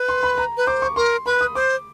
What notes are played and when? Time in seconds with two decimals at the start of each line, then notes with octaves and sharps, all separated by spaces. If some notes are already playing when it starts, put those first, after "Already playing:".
Already playing: B4
0.09 C6
0.23 B5
0.38 A#5
0.57 B4
0.67 C5 D6
0.82 C#6
0.96 A#4 C6
1.26 B4 B5
1.41 D#6
1.55 C5 D6